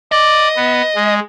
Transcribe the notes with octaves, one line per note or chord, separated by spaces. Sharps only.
D5 D#5
B3
G#3